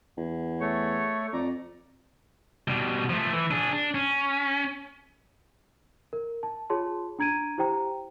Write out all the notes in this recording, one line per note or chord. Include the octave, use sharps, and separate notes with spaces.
E2
A3 C#5
F2 D5 A#5
B2 G3
F3 A3
E3
D4 G#4
D4
C#4
A#4
A5
F4 G#4 C#5 A5 C6
D4 A#5 G#6 D7 D#7
E4 G4 C5 G5 A#5